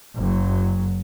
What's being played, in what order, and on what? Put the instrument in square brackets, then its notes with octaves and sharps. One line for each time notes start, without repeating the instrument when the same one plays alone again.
[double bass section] F#1 F#3